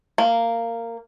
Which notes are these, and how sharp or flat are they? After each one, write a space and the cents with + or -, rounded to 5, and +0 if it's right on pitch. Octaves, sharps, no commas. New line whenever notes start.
A#3 -15